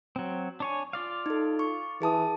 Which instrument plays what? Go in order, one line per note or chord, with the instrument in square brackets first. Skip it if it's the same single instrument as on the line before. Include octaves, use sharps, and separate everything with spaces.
[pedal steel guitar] F#3 C4
D4 C#5 G#5
F4 D5 F5
[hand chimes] D#4 A4
C#6
[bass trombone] E3 [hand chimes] G#4 A5 D#6